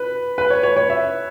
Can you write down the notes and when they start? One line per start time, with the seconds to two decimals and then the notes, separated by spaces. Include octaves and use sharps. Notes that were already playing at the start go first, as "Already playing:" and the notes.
Already playing: B4
0.38 B4
0.50 C#5
0.63 C#5
0.77 C#5
0.90 E5